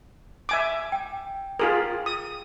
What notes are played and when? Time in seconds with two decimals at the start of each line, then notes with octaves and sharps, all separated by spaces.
0.49 E5 G#5 D6
0.92 G5
1.59 F4 G#4 A#4
2.06 D#6